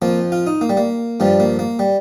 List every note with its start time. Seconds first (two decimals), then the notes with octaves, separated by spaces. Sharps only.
0.02 F2 F3 A#3
0.32 F4
0.47 D#4
0.61 A#3
0.69 G3
0.77 A#3
1.20 G2 F3 G3
1.40 A#3
1.59 A#3
1.79 G3